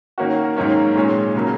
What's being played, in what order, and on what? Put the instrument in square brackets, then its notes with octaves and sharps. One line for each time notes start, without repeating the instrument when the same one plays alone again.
[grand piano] D#3 A#3 C#4 F#4
G#2 D#3 F#3 A#3 C#4
A#2 G#3 C#4
C#3 F#3 A#3